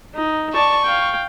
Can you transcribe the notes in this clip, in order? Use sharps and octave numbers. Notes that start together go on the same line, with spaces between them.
D#4
D5 A5 C#6
F5 G5